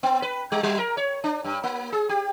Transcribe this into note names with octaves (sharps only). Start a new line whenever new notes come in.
B3
B4
G3
F#3
A#4
C#5
D4
G2
A#3
G#4
G4